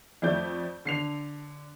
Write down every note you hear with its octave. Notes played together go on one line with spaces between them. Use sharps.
F2 A3 D5 G6
D3 C7 F7